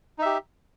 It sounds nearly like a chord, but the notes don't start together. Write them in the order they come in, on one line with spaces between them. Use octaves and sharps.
D#4 E5 G4